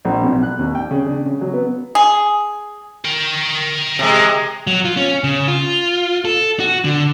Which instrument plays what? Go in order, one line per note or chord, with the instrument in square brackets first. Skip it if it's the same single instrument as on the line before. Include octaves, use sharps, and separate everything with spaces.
[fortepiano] A#1
B1
F#6
D#2
G5
C#3
D4
C#3
F#3
B3
[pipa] G#4
[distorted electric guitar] A#4 G5
[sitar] C3 G#3
[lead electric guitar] F#3
F4
C#4
C#3
F4
A4
F#4
D3